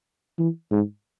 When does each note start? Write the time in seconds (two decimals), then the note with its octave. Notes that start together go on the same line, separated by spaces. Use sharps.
0.39 E3
0.71 G#2